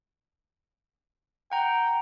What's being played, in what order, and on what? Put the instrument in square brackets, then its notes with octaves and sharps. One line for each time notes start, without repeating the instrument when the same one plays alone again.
[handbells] F#5 A#5 [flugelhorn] G5